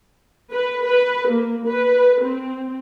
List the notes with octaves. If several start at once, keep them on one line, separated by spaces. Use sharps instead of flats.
B4
B4
A#3
B4
C4